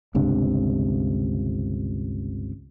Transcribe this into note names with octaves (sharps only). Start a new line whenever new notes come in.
G1 C#2 C3 D4